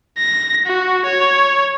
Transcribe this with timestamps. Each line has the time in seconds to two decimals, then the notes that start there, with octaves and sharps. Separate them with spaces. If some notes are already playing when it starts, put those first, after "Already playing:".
0.18 A#6
0.66 F#4
1.06 C#5